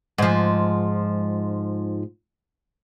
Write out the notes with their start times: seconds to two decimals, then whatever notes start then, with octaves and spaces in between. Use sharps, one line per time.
0.18 G#2 F3